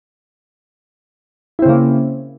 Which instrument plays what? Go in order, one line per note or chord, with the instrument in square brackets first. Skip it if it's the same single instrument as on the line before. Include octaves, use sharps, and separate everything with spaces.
[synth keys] E4
C4
C#3
A#3